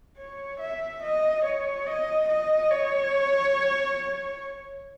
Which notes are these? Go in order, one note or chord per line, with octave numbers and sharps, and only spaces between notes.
C#5
E5
D#5
C#5
D#5
D#5
C#5